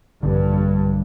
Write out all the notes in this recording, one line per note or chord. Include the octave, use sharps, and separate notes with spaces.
A#1 G2 D3